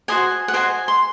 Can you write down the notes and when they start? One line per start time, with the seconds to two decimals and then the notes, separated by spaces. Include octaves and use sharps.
0.08 F#4 C5 D#5 G#5
0.48 F#5
0.53 F#4 C5 D#5 G#5
0.88 C6